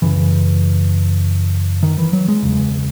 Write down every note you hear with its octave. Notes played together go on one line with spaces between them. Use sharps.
F#2 C#3 E3
D#3
E3
F#3
G#3
E2 C#3